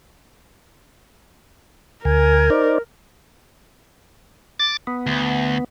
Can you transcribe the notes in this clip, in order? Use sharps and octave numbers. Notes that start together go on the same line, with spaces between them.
D2 A#4 G#5
D#4 C5 D5
D6 A6
B3
D2